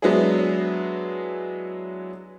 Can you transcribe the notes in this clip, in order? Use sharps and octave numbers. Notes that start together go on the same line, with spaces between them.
F#3 G#3 B3 D4 E4 G#4